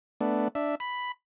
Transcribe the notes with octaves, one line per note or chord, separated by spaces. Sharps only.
A3 B3 D4
D4 E5
B5